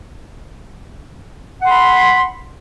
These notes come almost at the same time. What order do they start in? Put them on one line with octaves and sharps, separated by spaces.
F#5 C6 B5